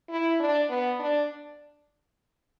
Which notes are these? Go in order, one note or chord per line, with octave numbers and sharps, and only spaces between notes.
E4
D4
B3
D4